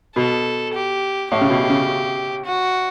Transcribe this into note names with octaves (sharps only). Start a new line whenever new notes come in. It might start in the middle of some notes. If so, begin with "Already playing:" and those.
B2 A4
G4
A2 G4
C#3
B2
C#3
F#4